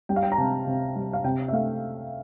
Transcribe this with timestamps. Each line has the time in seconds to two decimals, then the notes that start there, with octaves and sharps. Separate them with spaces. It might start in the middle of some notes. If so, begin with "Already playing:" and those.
0.09 G3 G5
0.16 F5
0.23 G5
0.32 A#5
0.38 C3 A5
0.67 C3
0.96 G3
1.13 F5
1.24 C3 G5
1.48 E5
1.53 A3 F5